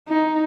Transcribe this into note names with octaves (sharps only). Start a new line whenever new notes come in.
D#4